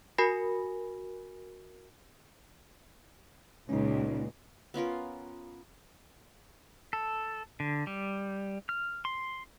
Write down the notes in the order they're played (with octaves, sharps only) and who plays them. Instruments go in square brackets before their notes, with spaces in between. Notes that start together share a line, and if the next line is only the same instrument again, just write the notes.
[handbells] F#4 A#4 G#5 B5 A#6
[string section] C#2 A#2 [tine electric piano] C#4 D#4
[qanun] B3 C#4 F4 A#4
[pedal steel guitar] A4
D3
G3
F6
C6